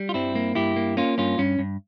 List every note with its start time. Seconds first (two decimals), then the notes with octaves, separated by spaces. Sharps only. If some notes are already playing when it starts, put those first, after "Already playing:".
Already playing: G3
0.09 F4
0.14 G2 C4 E4
0.35 A#3
0.55 G2 E4 G4
0.76 A#3
0.97 A#3 C#4 F4
1.18 G2 C#4 F4
1.38 G2 C#4
1.59 G2